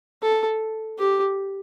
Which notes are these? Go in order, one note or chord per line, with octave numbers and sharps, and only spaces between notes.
A4
G4